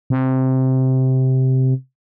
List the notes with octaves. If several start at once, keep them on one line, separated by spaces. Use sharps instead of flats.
C3